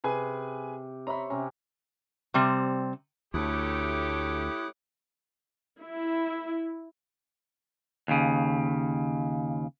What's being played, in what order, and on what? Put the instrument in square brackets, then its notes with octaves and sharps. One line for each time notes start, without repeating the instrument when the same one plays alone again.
[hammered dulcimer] C3 [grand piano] G#4 B4 G#5
[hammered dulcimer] C5 C#5 E5 [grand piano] A#5 B5
[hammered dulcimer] C3 C#4 [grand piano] A#5
[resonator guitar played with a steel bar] C3 G3 C4
[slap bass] D2 [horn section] A3 G4 [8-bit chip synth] E4 D#6 F#6 [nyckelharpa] C#5 D6
[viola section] E4
[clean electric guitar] D#2 C#3